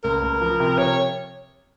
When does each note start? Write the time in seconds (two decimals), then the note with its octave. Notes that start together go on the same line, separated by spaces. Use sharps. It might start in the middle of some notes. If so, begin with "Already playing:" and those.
0.04 C#2 A#4
0.22 C#2
0.41 F3
0.60 C3
0.77 C3 C#5